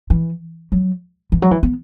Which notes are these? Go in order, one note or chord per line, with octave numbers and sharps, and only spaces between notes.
E3
F#3
E3
F#3
E3
B3